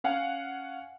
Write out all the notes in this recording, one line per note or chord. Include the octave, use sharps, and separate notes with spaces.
C#4 F5 F#5 G#5